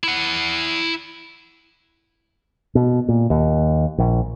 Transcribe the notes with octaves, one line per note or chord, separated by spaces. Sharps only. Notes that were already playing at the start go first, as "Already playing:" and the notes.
E4 F#5
B2
A#2
D#2
A#1